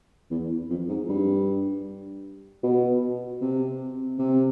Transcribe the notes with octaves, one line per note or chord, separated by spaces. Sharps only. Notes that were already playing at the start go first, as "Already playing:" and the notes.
E2
F2
G#2
G2
B2
C3
C3